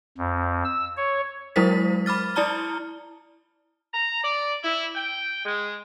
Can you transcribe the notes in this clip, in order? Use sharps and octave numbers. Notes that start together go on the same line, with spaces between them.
F2
E6
C#5
F#3 G#3 E4 A#4 C5 B6
B5 D6 F6 A6
E4 D5 A5 A#5 F6 G7
A#5
D5
E4
G5
G#3